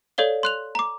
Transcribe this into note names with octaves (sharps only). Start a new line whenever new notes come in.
A4 C#5 D5 F5 G7
C6 F#6 F7
A#5 D6